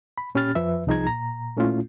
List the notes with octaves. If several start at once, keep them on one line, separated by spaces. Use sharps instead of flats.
B5
A#2 C#4 G4 B5 F6 A6
F2 F3 B4 E5
C2 F3 D#4 G#4 A#5 G#6
A#2 A#5
A#2 A3 C#4 E4 F4